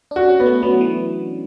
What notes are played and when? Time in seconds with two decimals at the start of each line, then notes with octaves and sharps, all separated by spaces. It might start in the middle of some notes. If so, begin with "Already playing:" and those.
0.11 D4
0.16 F#4
0.29 C#4
0.40 B3
0.46 A3
0.63 F#3 B3
0.81 E3